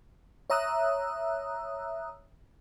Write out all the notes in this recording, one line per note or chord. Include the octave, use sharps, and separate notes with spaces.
C#5 E5 A#5 D#6 E6 F#6